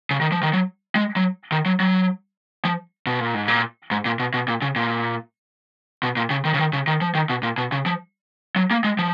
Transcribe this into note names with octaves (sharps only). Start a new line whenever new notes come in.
C#3
D#3
F3
D#3
F#3
G#3
F#3
D#3
F#3
F#3
F3
B2
A#2
G#2
A#2
G#2
A#2
B2
B2
A#2
C#3
A#2
B2
A#2
C#3
D#3
C#3
D#3
C#3
D#3
F3
D#3
B2
A#2
B2
C#3
F3
F#3
A#3
G#3
F3